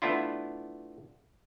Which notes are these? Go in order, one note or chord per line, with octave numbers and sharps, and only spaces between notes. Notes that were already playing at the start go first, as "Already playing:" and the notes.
A3 B3 D4 E4 F4